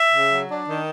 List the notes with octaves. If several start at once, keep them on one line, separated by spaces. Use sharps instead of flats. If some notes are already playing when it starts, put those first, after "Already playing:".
Already playing: E5
C#3
F#3
D4
D#3